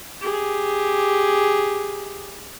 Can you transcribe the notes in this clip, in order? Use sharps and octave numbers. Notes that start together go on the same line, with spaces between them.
G4 G#4